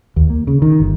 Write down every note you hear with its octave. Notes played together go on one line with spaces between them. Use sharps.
D#2
A#3
C#3
D#3
G1